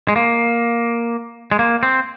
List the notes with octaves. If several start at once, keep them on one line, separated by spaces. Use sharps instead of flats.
G#3
A#3
G#3
A#3
C4